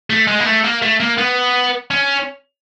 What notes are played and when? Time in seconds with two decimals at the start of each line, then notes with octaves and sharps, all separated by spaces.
0.10 A3
0.27 G#3
0.40 A#3
0.46 A3
0.64 A#3
0.82 A3
1.00 A#3
1.18 B3
1.91 C#4